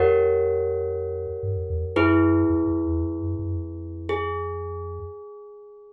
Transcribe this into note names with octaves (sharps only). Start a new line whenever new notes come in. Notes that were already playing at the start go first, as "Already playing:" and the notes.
Already playing: F2 G4 A#4 C#5 F#5
G2
F2
E2
F2
F#2 E4 G#4 B4
F2
F2
E2
F2
F#2
F#2
F2
G#4